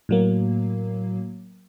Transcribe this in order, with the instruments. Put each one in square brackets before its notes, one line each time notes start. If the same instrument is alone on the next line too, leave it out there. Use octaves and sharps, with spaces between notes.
[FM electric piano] A2 F#3 A#3